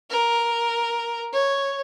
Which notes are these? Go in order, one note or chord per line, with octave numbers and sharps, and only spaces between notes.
A#4
C#5